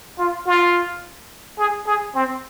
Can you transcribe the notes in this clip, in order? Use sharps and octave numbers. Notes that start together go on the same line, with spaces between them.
F4
F4
G#4
G#4
C4